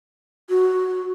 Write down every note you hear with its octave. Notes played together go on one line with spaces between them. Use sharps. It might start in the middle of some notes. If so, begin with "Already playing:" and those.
F#4